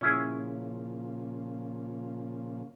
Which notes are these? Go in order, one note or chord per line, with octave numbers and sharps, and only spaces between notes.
A#2 C#3 F3 C#4 E4 G#4